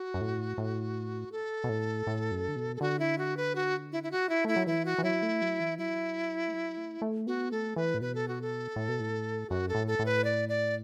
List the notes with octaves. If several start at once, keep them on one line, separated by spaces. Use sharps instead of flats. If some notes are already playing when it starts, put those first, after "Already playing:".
Already playing: F#4
F#2
A2
A2
A4
B2
A2
A2
F#2
D3
B2
A4
D3 F#4
E4
F#4
B4
F#4
E4
E4
F#4
E4
A3 E4
F#3
E3 E4
F#4
E3
F#3 E4
A3
F#3
E3
F#3 E4
A3
F#3
A3
A3
B3 F#4
A3 A4
E3 B4
A2
B2 B4
A4
F#4
A4
A2
B2
A2
F#2 F#4
A4
A2
A4
A2
B4
D5
D5